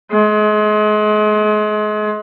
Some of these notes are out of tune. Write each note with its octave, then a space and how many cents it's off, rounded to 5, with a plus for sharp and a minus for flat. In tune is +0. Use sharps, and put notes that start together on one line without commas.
G#3 +35